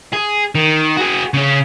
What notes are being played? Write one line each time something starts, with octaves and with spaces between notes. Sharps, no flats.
G#4
D#3
F#4 G#4
C#3 C#4